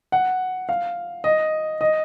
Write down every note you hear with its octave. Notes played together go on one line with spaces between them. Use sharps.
F#5
F5
D#5
D#5